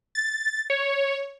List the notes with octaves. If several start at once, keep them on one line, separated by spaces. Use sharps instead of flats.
A6
C#5